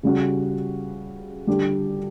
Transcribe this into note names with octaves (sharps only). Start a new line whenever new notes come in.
C#3 G3 C#4 F#4
D3 G3 D4 G4